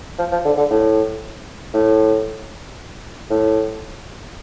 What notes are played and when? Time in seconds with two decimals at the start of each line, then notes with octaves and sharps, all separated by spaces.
0.19 F3
0.31 F3
0.45 D3
0.57 D3
0.70 A2
1.74 A2
3.30 A2